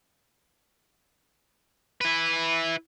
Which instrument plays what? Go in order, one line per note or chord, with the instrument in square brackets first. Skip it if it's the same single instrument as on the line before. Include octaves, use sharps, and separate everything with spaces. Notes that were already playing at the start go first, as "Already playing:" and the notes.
[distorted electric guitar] E4 B4